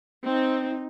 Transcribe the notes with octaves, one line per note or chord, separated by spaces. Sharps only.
C4 D#4